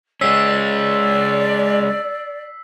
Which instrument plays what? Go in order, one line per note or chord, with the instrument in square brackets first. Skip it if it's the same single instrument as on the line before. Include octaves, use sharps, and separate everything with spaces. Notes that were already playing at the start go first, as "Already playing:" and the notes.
[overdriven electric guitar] G#3 C#4 [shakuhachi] D5 [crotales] E6 B6 C7